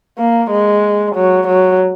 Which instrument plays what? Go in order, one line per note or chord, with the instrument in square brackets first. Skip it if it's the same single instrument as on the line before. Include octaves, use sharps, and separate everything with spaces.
[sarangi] A#3
G#3
F#3
F#3